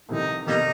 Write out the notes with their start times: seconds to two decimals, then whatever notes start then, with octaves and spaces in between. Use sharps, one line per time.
0.09 C2 C3 D#3 D#4
0.47 C3 D#3 G3 A#3 D#4